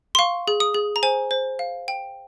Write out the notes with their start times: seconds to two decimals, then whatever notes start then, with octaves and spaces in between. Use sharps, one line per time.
0.15 C6
0.19 F5 C#6
0.48 G#4
0.60 D#6
0.74 G#4
0.96 A#5
1.03 C5 G#5
1.31 C5
1.59 F5
1.88 G5